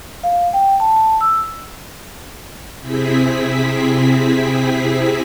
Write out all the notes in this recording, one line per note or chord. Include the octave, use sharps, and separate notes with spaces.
F5
G5
A5
A5
E6
C3 C4 E4 G#4 B6